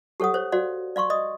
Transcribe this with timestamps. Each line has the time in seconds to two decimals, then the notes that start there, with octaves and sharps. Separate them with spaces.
0.20 G4 A4 C#5 F#5 D#6
0.34 C5 C#5
0.52 F#4 C5 D5 F5
0.96 D5 F5 C6 C#6
1.10 D5 D#5 D#6